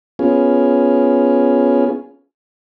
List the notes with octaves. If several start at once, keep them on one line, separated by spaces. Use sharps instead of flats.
B3 C#4 F4 G#4